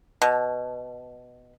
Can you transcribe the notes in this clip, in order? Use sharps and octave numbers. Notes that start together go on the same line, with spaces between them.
B2